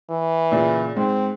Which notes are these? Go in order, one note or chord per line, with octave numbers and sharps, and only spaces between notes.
E3
A#2 C#3
G#2 C4